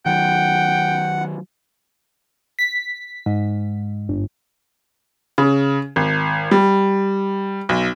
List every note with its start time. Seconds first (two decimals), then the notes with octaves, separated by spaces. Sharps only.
0.06 D#3 F#3 F#5 G5
2.59 B6
3.26 G#2
4.09 G1
5.38 C#3
5.96 G#1
6.51 G3
7.69 B1